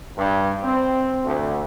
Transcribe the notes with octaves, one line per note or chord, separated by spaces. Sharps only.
G2
C4
D2